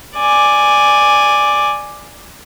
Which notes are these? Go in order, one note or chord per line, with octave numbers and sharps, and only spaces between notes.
D5 G#5